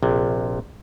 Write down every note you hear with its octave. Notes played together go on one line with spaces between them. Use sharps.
A#1 C3